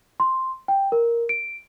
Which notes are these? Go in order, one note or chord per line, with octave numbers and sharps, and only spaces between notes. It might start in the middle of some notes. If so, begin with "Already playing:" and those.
C6
G5
A#4
D7